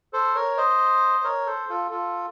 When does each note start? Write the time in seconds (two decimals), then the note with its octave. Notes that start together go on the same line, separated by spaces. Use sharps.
0.13 A4 C5
0.35 A#4 C#5
0.57 C5 D#5
1.24 A#4 C#5
1.46 A4 C5
1.69 F4 A4
1.91 F4 A4